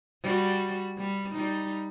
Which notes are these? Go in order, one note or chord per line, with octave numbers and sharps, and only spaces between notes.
G3 F#4
G3
G3 D#4